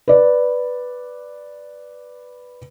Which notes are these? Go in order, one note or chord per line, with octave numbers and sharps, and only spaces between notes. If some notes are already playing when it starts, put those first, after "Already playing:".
B4 D5